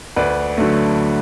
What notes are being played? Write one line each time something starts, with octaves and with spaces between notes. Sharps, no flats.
D2 B4 D5
D3 F#3 A3